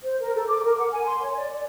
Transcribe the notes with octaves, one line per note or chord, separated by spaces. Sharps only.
C5
A#4
A4
D6
A#4
F#5
G#5
C6
C#5
D5
D5